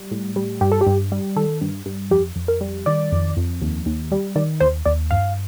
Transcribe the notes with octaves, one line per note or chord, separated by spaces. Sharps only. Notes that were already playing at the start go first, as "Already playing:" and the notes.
Already playing: G3
A2
G3
G2 G4
A4
G4
G2
G3
D#3 A4
G2
G2
F2 G4
F2
A#4
G3
D#3 D5
F2
F2
D#2
D#2
G3
D#3 D5
D#2 C5
D#2 D5
G2 F5